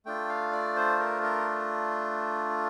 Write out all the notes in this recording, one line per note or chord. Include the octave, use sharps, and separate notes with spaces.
A3 D4 F4 G5
F5
D5
C5
A#4
A#4